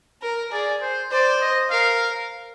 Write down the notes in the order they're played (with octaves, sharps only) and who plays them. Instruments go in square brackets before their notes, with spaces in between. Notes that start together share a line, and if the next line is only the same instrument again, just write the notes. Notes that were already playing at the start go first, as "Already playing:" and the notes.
[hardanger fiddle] A#4
[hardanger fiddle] G#4 [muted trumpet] D5
[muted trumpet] C5
[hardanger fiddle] C5 [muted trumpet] D5
[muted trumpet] D#5
[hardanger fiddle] A#4 [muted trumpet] F5